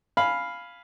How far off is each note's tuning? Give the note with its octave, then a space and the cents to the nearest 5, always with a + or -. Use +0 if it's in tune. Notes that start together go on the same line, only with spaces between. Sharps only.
F5 +0 G#5 +0 B5 +0